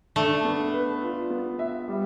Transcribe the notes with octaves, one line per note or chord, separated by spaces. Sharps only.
A3 D4
B3
B4
F4
B3
E5
G3